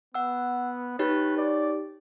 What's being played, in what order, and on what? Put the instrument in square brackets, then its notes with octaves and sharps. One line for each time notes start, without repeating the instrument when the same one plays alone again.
[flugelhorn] B3 [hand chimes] F#5 E6
[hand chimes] D#4 G4 C#5 [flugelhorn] B4
[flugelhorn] D5